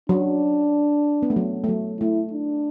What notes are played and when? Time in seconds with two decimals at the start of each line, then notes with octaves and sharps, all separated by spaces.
0.09 F#3 D4
1.23 B3
1.30 A3
1.36 F#3
1.64 A3
1.69 F#3
2.00 A3 E4
2.33 D4